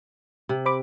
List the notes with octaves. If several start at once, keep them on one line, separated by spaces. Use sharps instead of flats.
C3
C5 B5 D6